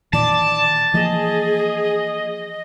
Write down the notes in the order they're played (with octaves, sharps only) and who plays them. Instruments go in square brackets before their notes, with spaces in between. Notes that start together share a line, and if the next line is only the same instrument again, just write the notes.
[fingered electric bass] A#2 D#3 E3 [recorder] D5 [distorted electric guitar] A5
[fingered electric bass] E3 F3 A#3 [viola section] G#4 [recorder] D#5